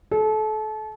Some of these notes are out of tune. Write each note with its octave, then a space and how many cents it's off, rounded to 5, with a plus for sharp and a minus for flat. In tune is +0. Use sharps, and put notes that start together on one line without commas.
A4 -30